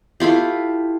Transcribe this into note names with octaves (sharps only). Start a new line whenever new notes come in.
A3 E4 F4 G4